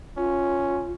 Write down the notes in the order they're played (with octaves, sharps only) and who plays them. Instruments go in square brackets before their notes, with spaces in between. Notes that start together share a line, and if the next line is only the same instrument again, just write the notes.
[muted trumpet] C#4 [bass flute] F4